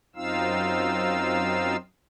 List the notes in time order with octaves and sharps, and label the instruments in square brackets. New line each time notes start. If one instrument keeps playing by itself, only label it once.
[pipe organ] F#2 C4 D#4 F4 F5 E6